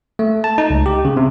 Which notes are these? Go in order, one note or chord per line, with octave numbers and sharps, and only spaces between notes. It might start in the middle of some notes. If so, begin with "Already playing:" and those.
A3
A5
D#4
C#2
G4
C#3
C3